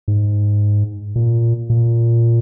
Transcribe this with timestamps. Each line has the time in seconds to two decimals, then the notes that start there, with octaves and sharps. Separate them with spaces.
0.08 G#2
1.16 A#2
1.70 A#2